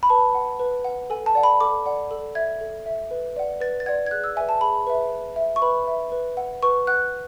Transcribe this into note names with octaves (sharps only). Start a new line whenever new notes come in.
B5
B4 A5
F#5
B4
F#5
A4 G#5
A5
D5 F#5
B5
A4 D6
D5 F#5
A4
E5 G#6
A4
E5
B4
D5 F#5
B4 A6
A6
D5 F#5 G#6
G#6
G#4 F#6
E6
B4 E5 G#5
A5
G#4 B5
B4 E5
B4
E5
C#6
B4 B5
E5
B4
F#5
B4 C#6
F#5 F#6